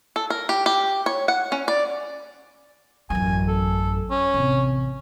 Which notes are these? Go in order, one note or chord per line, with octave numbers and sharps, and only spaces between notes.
A4
A#4
G4
G4
C#5
F#5
C#4
D5
A1 F#2 G#5
A4
C#4
A1 C3